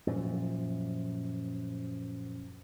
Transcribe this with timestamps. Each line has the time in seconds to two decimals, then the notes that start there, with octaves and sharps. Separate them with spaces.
0.07 F#2 A#2 F3